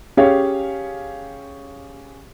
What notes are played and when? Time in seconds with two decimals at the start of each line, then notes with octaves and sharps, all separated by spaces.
0.17 C#4 G4 G#4 C#5 F5